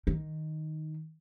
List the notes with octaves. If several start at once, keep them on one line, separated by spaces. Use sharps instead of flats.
D#3